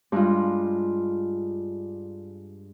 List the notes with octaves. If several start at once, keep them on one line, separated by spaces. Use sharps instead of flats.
G2 G#3 F4